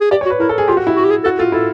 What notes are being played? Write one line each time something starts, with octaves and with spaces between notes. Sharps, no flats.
G#4
G4 D5
C#5
F#4
B4
E4 A#4
A4
G#4
F4 G4
F#4
E4
F#4
G4
G#4
F#4 A4
F4 A4
E4 A4